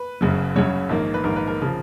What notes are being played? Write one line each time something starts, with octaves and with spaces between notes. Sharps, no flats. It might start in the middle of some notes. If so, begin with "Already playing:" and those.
Already playing: B4
F#1 F#2 C#3 F#3
F#1 F#2 C#3 F#3 C#5
A#1 G#2 D#3 A#3
B4
A#1 G#2 D#3 A#3 A#4
B4
A#4
C#3 F3